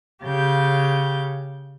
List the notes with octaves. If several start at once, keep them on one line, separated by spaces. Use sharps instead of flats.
C#3 G4 F5 G6